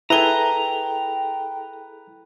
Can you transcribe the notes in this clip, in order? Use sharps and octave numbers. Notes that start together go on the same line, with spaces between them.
E4 G#4 A4 B4 G5 A#5 G7